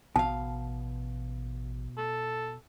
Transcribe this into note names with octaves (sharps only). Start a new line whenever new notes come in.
A1 B2 F5 A5
A4